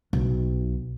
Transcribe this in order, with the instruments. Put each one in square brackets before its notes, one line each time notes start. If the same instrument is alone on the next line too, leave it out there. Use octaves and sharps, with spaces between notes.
[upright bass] B1